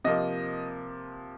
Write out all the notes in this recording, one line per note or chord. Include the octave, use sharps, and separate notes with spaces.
C3 F3 A#3 D#5